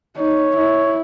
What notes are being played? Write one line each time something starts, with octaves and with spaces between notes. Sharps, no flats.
D#4 C#5
E4